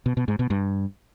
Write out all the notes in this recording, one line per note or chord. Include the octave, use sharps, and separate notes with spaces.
B2
B2
G#2
B2
G2